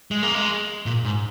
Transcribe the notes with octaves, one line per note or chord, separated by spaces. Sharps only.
G#3
A#3
G#3
A#2
G#2